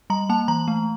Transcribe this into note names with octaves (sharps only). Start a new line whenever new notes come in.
G3 A#5
A#3 A5
E3 A#5
A3